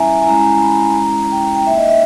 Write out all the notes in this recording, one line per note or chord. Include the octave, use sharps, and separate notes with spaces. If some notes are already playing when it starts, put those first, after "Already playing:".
Already playing: G3 C#4 E4 E5 G#5 A#5
G#5
G#3 C#4 E4 A#5
B5
G#3 C#4 E4 A#5
G5
G5
A#3 D#4 E5
D#5
E5